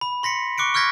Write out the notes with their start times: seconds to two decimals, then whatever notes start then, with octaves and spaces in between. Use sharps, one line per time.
0.01 B5
0.23 C6 A#6 B6 C#7
0.58 C#6 D6 F#6 C#7 D7
0.74 C#6 F6 G6 G#6 A#6 B6